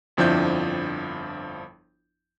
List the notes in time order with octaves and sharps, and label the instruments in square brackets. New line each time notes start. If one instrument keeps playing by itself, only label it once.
[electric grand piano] G1 F2 F3 D4 E4 G6